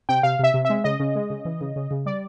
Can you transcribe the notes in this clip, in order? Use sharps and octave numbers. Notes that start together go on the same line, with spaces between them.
C3 G5
C3 F5
C3 E5
C3
G#3 E5
C#3 D#5
C#3
G#3
C#3
E3
C#3
C#3
C#3
G3 D5